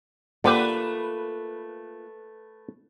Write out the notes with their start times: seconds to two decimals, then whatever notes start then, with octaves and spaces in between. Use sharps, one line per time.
0.44 D3 A3 A#3 F4 G4 B4